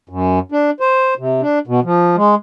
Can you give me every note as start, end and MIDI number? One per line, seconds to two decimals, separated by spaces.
0.09 0.39 42
0.52 0.70 62
0.80 1.14 72
1.18 1.41 48
1.41 1.59 62
1.67 1.80 47
1.84 2.16 53
2.16 2.35 56